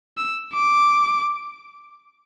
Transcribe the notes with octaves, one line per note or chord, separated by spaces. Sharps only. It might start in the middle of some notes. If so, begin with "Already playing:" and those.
E6
D6